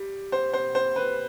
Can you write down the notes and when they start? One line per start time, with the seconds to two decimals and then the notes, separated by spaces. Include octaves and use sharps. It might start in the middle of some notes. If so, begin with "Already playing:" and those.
Already playing: G3
0.32 C5
0.53 C5
0.75 C5
0.96 B4